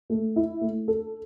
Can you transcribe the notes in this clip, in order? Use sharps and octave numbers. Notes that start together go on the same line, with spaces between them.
A3
E4
A3
A4